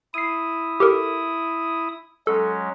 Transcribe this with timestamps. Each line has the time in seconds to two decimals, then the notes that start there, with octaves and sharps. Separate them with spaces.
0.14 E4 D#6 C7 D#7
0.80 G4 A4 A#4
2.27 F#3 G#3 C#4 A4